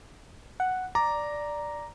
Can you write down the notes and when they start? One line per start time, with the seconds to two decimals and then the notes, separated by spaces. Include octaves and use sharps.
0.60 F#5
0.95 D5 A#5